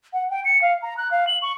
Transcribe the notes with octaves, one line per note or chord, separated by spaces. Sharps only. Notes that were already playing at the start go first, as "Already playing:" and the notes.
F#5
G5
C#7
F5
A#5
F#6
F5
F#7
C#6